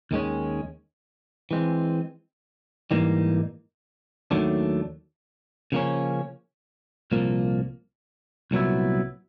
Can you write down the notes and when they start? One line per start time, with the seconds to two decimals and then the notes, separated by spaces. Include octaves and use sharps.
0.11 D#2 D#3 G#3 C#4
1.51 E3 G#3 C4
2.91 G#2 E3 G3 A#3 D#4
4.31 D#2 D#3 F#3 A3 D4
5.72 C#3 F3 A#3 C#4
7.12 C2 A#2 F3 A#3
8.51 C2 A#2 F#3 B3 E4